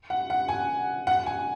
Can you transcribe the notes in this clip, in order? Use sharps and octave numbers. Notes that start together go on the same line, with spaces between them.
F#5
F#5
G#5
F#5
G#5